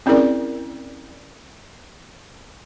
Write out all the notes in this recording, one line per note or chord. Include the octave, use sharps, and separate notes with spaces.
C4 C#4 E4 G#4 A#4 D5